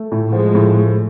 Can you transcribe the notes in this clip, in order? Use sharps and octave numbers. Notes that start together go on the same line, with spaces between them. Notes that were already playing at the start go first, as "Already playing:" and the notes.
Already playing: A3
A2
F3 G#3
A2
A3